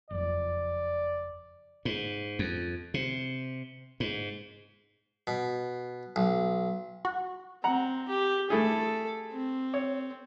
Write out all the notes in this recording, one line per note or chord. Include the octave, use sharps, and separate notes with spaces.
F#1 F2 D5
G#2
F2
C3
G#2
B2
B1
F#4
C4 F#5 A#5
G4
A3 E4 G#4 A4
C4
C#5